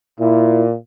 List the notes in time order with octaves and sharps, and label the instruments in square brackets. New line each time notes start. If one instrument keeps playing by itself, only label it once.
[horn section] A#2 [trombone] E4